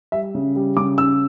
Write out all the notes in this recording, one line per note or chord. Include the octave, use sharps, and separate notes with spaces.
G3 E5
C#3
G3
C#3 D6
C#4 E6